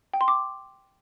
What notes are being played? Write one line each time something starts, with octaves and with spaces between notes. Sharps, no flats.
G5
C6
D6